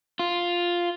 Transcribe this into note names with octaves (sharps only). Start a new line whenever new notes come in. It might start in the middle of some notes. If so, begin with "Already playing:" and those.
F4